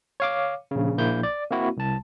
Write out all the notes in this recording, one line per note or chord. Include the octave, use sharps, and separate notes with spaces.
C#5 F5 D6
A#1 C#3
A#1 A#3 E4 G6
D5
A#3 C4 E4 F#4
C2 A5